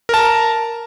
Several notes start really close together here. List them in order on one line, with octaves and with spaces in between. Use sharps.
A#4 A5 A#5